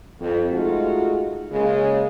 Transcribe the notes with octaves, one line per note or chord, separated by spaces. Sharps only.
F2
G#3 A3 D#4 F4 F#4
C#3 G#3 A#3